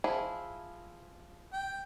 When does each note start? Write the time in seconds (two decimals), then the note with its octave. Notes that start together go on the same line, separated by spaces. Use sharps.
0.04 F3 E4 G#4
1.52 G5